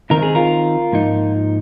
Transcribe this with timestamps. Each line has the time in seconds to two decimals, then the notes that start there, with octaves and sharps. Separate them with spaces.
0.10 D#3 C4 D#4 A#4
0.22 G#4
0.35 F4 A#4
0.92 G#2 F3 A#3 D#4